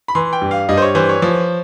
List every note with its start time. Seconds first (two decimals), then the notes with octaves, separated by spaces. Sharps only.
0.08 B5
0.15 E3 C6
0.33 G5
0.42 G2
0.51 F5
0.69 G2 D#5
0.77 C5
0.82 C#5
0.95 E3 C5
1.09 C#5
1.22 F3